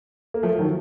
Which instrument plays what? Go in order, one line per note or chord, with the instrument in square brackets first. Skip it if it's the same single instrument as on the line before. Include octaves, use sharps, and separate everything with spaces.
[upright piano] A#3
F3 A3
D#3 F#3